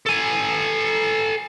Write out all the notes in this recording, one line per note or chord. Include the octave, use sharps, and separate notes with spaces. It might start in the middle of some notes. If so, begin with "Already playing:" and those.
A4 G#5